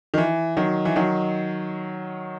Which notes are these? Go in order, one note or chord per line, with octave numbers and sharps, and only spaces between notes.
D#3
E3
D#3 F#3
E3
D#3 F#3